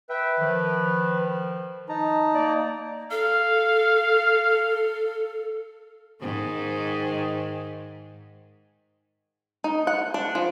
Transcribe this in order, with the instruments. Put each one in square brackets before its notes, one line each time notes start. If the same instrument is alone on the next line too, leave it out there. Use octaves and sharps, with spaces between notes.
[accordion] B4 [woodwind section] E5 G5
[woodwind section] D#3 F3
[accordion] D#4 A5 A#5
[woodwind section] A#3 D5
[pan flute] A4 [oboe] F5
[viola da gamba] G#2 D#3
[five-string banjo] D#4
F#5
D4
F3